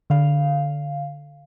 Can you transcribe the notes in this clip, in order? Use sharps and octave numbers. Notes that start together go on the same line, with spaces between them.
D3 F5